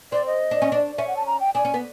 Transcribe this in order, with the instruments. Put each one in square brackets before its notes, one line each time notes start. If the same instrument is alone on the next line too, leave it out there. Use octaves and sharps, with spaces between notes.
[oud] C4 [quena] D5
[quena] D#5
[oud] D4
C#4
D4
[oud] C#4 [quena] E5
[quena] F#5
A5
A#5
G5
[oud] D4 [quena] G#5
[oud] C#4
B3